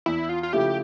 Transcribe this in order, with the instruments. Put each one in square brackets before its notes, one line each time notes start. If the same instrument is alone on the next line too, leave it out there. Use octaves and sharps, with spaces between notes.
[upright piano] E2 [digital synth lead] E4
[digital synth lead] F4
F4
[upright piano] C#3 F3 A3 E4 [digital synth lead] G4